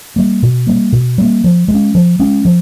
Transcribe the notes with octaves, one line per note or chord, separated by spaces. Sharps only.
G3 A#3
B2
G3 A#3
B2
G3 A#3
F3
G#3
C#4
F3
G#3 C#4
F3